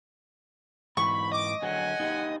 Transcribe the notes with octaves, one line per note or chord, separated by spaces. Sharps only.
G#2 E3 B5 C#6
D#5 D6
D3 F#3 G#4 F#5 G#5
D#4 G4 G#4